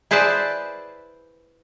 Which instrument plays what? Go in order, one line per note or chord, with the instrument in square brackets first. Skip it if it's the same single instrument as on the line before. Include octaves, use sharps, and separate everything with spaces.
[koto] E4 G#4 B4 C5 D5 A5